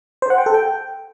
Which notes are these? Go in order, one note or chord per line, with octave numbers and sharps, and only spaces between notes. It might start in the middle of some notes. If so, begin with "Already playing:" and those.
C5
F#5
G5
A4
G5